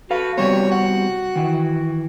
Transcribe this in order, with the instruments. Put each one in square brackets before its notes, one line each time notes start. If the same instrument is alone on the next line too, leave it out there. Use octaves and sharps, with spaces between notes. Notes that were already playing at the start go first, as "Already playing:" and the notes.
[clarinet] F#4 [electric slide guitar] A4 F5 [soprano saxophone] B4
[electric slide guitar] C3 G3 B3 [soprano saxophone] C#5
[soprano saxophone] F#5
[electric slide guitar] D#3 E3